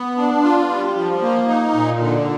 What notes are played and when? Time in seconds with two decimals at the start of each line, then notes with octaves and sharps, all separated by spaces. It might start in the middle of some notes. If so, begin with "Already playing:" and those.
Already playing: B3
0.17 D4
0.43 F4
0.69 G3
0.95 F3
1.22 A#3
1.48 D#4
1.74 A#2
2.00 D3